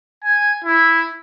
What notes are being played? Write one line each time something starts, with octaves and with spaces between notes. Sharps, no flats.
G#5
E4